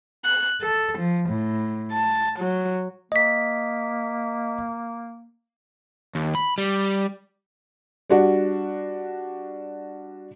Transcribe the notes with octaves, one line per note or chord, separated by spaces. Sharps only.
F#6
A4
F3
A2
A5
F#3
A#3 D#5 B6
D#2
B5
G3
G3 D4 F#4